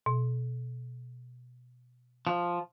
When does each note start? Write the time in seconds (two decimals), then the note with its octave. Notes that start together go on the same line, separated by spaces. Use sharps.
0.06 B2
2.27 F3